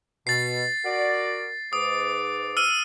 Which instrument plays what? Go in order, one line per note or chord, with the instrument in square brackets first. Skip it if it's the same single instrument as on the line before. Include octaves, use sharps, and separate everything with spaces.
[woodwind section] B2 [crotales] A6 C7
[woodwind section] F#4 A#4 D5
[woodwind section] G#2 B4 D6 [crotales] D#6
[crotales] E6 F6 D#7